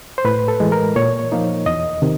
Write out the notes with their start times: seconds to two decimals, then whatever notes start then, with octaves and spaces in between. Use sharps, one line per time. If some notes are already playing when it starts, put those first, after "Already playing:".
0.18 C5
0.25 A2 B4
0.48 A4
0.60 E3 G#3
0.72 A#4
0.96 A#2 C#5
1.32 F3 A#3 D#4
1.66 E2 D#5
2.02 C3 D#3